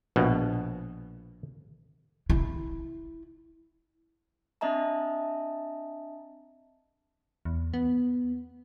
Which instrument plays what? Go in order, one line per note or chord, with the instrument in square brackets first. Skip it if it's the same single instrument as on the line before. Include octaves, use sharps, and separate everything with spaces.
[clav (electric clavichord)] A#1 B2
[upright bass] E4
[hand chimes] C4 D4 D#5 E5 A5 A#5
[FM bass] E2
B3